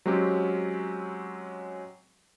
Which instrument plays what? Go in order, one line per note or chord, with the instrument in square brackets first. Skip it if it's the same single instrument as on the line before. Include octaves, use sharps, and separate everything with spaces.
[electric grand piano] F#3 G#3 C4 C#4 G4